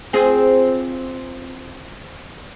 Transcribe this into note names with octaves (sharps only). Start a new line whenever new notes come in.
C4 F4 G#4